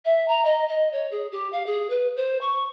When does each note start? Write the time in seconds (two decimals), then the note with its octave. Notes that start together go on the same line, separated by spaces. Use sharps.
0.05 E5
0.28 A#5
0.45 D#5
0.68 D#5
0.92 C#5
1.11 G#4
1.32 G4
1.52 F5
1.66 G#4
1.90 B4
2.16 C5
2.41 C#6